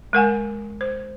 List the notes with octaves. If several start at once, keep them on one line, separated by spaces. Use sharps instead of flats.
G#3 A#4 F#5 G#5
C5